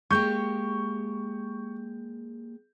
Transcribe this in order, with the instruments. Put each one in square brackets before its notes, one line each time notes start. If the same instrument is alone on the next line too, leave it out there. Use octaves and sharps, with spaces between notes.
[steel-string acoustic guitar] G#3 A#3 G4 [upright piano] C#6 G6